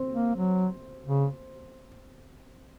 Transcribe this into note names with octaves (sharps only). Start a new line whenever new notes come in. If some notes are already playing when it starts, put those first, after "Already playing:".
Already playing: C4
A#3
F#3
C#3